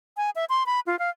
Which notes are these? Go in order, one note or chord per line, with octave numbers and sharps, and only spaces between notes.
G#5
E5
C6
B5
F4
F5